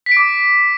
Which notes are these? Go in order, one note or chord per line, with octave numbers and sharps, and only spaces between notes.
B6
D7
D6